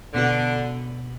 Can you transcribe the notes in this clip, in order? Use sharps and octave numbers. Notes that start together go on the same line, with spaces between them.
B2 D3 B3 F#4